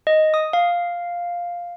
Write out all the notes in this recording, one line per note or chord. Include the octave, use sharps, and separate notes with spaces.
D#5
D#6
F5